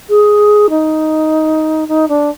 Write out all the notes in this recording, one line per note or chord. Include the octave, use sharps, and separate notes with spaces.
G#4
D#4
D#4
D4